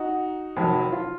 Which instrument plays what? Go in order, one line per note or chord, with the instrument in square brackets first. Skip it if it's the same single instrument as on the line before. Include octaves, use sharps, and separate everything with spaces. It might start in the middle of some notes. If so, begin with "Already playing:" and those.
Already playing: [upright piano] D#4 F#4
F1 F2 D#3 F#3
F4